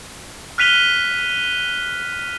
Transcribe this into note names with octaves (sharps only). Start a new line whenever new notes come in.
F6 F#6 B6 D#7 F7 G7